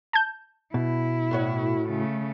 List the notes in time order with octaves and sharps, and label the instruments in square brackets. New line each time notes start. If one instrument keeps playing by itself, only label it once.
[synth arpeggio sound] A5 G6
[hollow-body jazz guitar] B2 [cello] E4
[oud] A2 F#4 C#5
[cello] C#3 A3